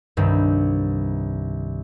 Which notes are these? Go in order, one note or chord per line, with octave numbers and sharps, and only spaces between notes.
C2 G2 D#3